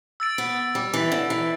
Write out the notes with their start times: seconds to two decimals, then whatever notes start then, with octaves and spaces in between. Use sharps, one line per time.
0.20 E6 A6 D7
0.38 B3
0.75 G3
0.94 E3
1.12 D3
1.30 E3